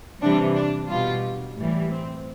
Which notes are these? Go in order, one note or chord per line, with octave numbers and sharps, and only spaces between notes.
C3 E3 G3 D4
D4
B2 G3 F4
A2 E3 G3
C4